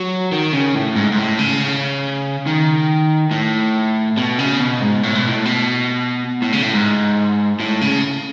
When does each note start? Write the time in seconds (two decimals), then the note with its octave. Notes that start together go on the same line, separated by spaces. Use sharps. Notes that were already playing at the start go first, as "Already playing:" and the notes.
Already playing: F#3
0.32 D#3
0.53 C#3
0.75 A2
0.96 G#2
1.12 G#2
1.17 A2
1.39 C#3
2.47 D#3
3.31 A2
4.17 B2
4.39 C#3
4.60 B2
4.81 G#2
5.03 A2
5.15 B2
5.27 A2
5.45 B2
6.42 A2
6.53 C#3
6.62 A2
6.74 G#2
7.60 A2
7.81 C#3